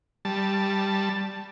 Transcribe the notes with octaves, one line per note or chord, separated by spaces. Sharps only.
G3 A5